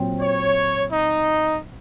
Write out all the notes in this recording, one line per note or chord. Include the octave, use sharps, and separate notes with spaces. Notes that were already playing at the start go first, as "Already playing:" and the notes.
Already playing: A#2 F#3 C4
C#5
D#4